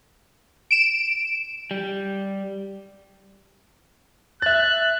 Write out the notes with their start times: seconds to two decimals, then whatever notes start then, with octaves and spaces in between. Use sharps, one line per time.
0.71 D7 E7
1.71 G3
4.42 E5 F#6 A6